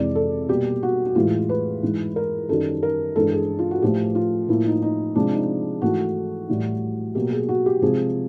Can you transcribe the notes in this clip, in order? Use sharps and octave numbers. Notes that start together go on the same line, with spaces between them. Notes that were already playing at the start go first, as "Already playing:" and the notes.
Already playing: F2 C3 E3 G#3 D5
A4
B2 G3 A#3 G4
F#4
F#4
A2 E3 G#3 F4
B4
G#2 E3 G#3
A#4
F#2 D#3 G3 A4
A#4
G2 E3 G#3 A4
G#4
F4
F#4
A2 F3 A3 G4
F4
A2 F3 A#3 E4
D#4
D#4
C3 F3 G#3 D4
D#4
G#2 E3 A3 F#4
A2 E3 G3
B2 F#3 A#3 G4
G#4
F#4
G4
C3 F3 G#3 G#4